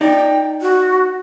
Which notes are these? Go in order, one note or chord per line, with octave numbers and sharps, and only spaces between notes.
D#4 D5 G5
F#4